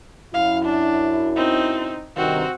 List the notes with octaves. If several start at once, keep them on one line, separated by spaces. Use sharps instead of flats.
F#2 E4 F5
D4
C4 D#4
G2 C3 D#3 C4 F#4